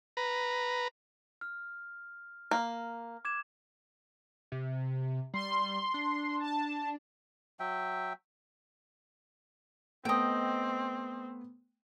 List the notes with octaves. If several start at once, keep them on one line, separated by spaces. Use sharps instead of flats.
B4 A#5
F6
A#3
D6 G#6 E7
C3
G3 C6
D4
A5
F#3 E5 G5
A3 B3 C4 D#5 G5